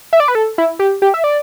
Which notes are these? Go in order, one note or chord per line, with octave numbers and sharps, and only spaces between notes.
E5
D5
B4
A4
E4
G4
G4
E5
D5